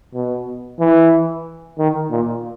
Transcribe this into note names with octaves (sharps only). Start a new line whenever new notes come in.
B2
E3
D#3
A#2